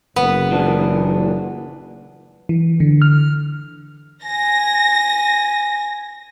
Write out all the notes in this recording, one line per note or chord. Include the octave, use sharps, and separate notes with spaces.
F#1 B3
A#2 E3 D4
E3
D3
F6
G#5 A#6